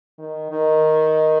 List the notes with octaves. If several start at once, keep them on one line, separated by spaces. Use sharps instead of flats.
D#3
D#3